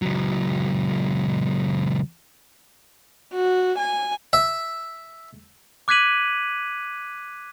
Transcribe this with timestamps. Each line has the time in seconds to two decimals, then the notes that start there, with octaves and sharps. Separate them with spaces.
0.02 C#2 F#3
3.34 F#4
3.79 G#5
4.33 E5
5.88 D6 F#6 G#6 B6 D#7 F#7